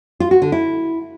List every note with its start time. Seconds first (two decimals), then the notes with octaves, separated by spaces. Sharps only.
0.20 F4
0.31 F#4
0.42 D3
0.52 E4